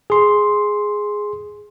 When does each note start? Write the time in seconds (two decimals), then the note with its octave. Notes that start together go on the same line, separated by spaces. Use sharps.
0.10 G#4 C6